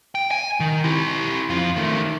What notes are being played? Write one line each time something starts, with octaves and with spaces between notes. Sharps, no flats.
G5
G#5
D#3
E4 G4
F2 F4
D#3 A3